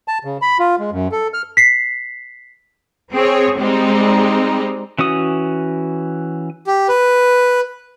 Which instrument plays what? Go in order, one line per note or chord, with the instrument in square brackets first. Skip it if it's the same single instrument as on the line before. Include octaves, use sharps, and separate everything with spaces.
[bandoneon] A5
C#3
B5
F4
G#3
F#2
A4
F6
[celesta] B6 C7
[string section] C4 G#4 C#5
G3 G#3 C4 D#4
[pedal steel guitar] E3 C#4 F#4 D#6
[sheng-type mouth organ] G4
B4